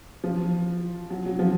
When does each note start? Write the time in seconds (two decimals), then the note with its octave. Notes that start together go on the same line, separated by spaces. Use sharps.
0.24 F3
1.10 F#3
1.26 F#3
1.39 F3